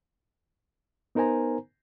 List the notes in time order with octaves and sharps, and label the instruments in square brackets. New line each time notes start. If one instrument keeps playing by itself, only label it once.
[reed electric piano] B3 D#4 A#4 C5 G#5 A#5